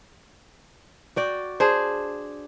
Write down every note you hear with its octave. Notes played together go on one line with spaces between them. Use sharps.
F#4 D5 G5
D4 G#4 C5